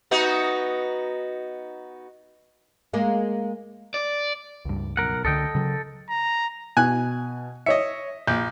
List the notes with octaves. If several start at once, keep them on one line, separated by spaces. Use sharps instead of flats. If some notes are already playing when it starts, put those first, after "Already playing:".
B3 D#4 F#4
G#3 A#3
D5
C#2 G2
B1 A#4 F#5
C#2 D3 A4 D#5 G5
C#3 F#3
A#5
B2 G#5 F#6
C#5 D#5 E5 C#7
A#1 G6